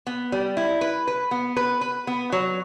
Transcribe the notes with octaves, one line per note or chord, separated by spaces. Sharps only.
B3
G3
E4
B4
B4
B3
B4
B4
B3
F#3